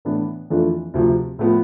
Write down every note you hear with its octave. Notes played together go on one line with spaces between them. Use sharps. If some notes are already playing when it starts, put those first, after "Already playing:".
A2 E3 B3 D4
F2 E3 A3 D4 F4
D2 C3 F3
A2 F3 B3